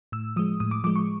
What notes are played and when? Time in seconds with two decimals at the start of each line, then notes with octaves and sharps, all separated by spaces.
0.12 A2 E6
0.36 F3 G#3 D#6
0.60 A2 D#6
0.71 D6
0.84 F3 G#3 D6
0.96 C#6